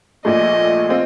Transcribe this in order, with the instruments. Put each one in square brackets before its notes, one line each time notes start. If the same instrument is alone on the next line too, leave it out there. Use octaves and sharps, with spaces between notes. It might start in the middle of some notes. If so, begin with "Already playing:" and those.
[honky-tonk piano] A#1 A#2 A3 [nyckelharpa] D#5
[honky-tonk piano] C4 F4